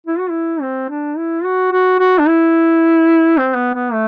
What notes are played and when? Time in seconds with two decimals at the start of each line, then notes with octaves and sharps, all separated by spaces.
0.07 E4
0.19 F#4
0.30 E4
0.61 C4
0.89 D4
1.17 E4
1.44 F#4
1.72 F#4
1.99 F#4
2.19 D4
2.28 E4
3.37 C4
3.56 B3
3.74 B3
3.93 A3